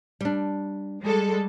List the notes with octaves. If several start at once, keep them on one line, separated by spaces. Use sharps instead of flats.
G3 D4
G3 G#3 A4